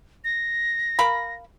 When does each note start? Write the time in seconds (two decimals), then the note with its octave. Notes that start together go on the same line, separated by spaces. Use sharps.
0.24 A#6
0.99 A#4 F5 B5